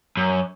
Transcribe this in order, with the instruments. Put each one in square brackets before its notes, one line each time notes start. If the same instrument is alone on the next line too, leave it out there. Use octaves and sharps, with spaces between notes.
[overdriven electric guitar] F#2